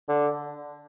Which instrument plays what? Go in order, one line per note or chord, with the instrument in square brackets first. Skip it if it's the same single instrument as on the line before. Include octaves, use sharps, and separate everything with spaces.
[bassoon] D3